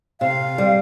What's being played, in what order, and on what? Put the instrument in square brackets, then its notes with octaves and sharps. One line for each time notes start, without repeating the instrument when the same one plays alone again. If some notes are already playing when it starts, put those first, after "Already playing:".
[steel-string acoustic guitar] C3 [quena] F5
[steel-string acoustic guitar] G3